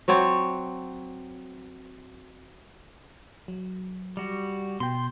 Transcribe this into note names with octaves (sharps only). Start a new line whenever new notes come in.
F#3 C4 C#5 D5
F#3
G3 F#4
B2 G5 C6